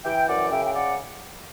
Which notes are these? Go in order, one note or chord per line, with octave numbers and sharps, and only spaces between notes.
E3 E5 G5
F#2 D5 F#5
C#3 E5 G5
G5
D5 F#5